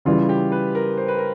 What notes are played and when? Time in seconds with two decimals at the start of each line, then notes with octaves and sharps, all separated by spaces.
0.05 C#3 E3 G3 F4
0.29 G4
0.52 B4
0.75 A#4
0.97 C5
1.08 B4
1.18 A#4